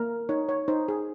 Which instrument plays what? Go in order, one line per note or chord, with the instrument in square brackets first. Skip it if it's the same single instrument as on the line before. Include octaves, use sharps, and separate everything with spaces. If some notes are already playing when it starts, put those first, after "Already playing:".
Already playing: [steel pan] A#3 A#4
D#4 C#5
C#5
D#4 C5
G#4